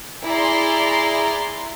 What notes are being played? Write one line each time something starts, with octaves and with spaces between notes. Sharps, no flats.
E4 G#4 D5 A#5 C6